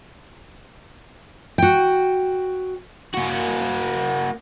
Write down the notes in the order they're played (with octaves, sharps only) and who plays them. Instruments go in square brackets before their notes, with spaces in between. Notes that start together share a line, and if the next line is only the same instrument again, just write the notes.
[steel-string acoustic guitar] F#4 G5
[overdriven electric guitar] A#3 F#4